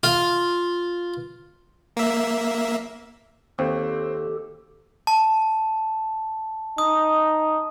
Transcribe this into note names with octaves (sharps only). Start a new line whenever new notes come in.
F4
A#3 E5
D#2 C4 G4 A4
A5
D#4 D#6